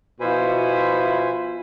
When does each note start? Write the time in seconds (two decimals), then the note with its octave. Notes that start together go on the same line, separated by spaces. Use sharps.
0.20 B2 F3 E4 F4 C5 G#5 B5